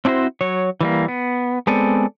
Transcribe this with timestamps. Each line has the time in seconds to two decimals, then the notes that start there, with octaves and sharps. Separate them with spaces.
0.05 C4 D4 E4 F#4 C5
0.41 F#3 C#5
0.81 E3 G3 A#3
1.08 B3
1.67 G#3 B3 C4 A4 D5 G#5